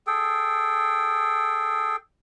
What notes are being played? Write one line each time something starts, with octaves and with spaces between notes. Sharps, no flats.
G#4 A4 G5